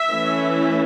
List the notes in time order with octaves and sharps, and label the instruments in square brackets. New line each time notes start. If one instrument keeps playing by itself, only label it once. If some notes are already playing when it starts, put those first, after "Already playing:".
Already playing: [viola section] E5
E3 A3 C#4